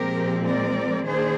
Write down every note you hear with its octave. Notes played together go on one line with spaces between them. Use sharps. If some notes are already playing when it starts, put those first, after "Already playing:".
Already playing: A#2 F3 G#3 C4 G4 A#4
A#4 D5
D#3 A#3 D4 G#4 C5